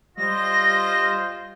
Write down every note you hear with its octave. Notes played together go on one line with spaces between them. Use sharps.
G3 F4 C5 D#5 A#6